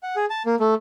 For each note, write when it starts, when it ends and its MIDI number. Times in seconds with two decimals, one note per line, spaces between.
0.03 0.16 78
0.16 0.25 68
0.30 0.43 81
0.46 0.55 58
0.60 0.74 57